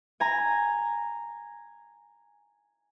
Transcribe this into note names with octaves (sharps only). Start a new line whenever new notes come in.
G#5 A#5